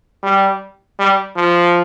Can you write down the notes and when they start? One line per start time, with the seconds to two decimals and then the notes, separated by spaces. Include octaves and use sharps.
0.23 G3
0.99 G3
1.36 F3